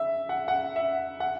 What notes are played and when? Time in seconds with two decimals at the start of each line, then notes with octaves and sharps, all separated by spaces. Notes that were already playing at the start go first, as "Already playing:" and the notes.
Already playing: E5
0.29 F#5
0.48 F#5
0.76 E5
1.20 F#5